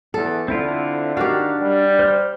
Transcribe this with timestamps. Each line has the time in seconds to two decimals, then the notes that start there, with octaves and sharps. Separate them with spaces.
0.14 E2 A4
0.48 D3 C4 E4 F4
1.17 D#3 D4 F#4 G4 F5
1.62 G3
1.99 C5 F6